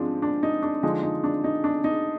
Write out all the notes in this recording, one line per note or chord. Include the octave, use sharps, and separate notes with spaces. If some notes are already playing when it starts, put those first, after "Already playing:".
Already playing: G#2 F3 G#3 C4 D4
D4
D#4
D4
D3 F3 G#3 D4 D#4
D#4
D4
D#4
D4
D#4